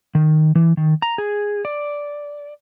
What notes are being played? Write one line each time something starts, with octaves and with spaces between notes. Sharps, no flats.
D#3
E3
D#3
A#5
G#4
D5